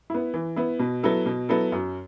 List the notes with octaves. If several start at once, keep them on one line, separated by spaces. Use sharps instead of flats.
B3 E4
E3
B3 E4
B2
F#3 B3 E4 A4
B2
F#3 B3 E4 A4
F#2